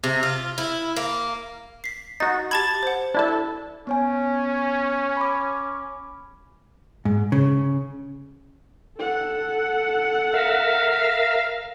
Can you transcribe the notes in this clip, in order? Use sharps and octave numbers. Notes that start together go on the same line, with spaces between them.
C3
F4
E4
A#3
B6 C7
D#4 F#4 A6
G4 A5 B5 G#6 A6
C5 F#5
D4 E4 A4
B3 C#4 C#5 G#5
B5 D6
G#2
C#3
A4 F#5
A#4 E5 F5